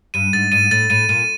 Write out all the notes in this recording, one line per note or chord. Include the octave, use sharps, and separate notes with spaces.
G2 D#7
G#2 A6
G#2 D#7
A2 A6
A2 D#7
A#2 D#7